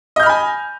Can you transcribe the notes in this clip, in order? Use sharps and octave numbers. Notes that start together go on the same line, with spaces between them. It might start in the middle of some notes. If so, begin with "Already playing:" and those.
D#5 G#5 B5 F6 G6